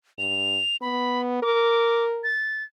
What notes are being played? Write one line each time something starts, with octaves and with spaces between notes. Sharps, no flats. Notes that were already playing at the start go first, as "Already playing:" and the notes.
G2 F7
B3 B5
A#4 D6
A6